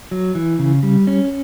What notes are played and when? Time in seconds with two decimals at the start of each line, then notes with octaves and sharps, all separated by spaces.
0.11 F#3
0.35 E3
0.59 C#3
0.83 G3
1.07 C#4